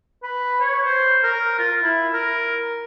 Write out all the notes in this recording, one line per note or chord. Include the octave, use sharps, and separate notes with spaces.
B4
C#5
C5
A#4
F4
E4
A#4